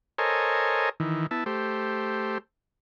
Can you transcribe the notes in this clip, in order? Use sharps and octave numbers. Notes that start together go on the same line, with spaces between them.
A4 A#4 C5 C#5 D#5 G#5
D#3 E3
B3 E4 A5
A3 G4 C5